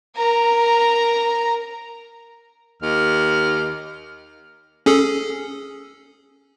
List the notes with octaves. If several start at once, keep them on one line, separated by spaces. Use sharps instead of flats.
A#4 A#5
D#2 F6
C#4 G#4 A4